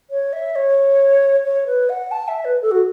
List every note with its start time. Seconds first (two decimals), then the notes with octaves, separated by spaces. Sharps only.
0.10 C#5
0.33 E5
0.55 C#5
1.44 C#5
1.66 B4
1.89 F#5
2.11 A5
2.28 E5
2.45 B4
2.62 A4
2.71 F#4